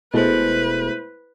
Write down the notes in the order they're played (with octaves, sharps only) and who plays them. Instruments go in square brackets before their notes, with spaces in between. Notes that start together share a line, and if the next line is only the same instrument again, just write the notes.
[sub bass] E1 [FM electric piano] B2 G#3 A3 [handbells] E4 C5 [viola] B4